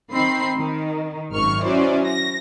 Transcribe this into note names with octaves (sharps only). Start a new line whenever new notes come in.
D#3 C4 B5 C7
D#3
G#1 F#2 D#3 C#6 F6
F#3 C#4 E4 F#4 C5 D5
A#6